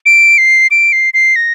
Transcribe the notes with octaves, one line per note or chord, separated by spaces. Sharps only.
D7
C7
D7
C7
C7
A#6